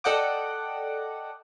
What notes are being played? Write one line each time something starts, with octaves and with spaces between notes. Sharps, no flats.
A4 D5 D#5 F#5 G5 D6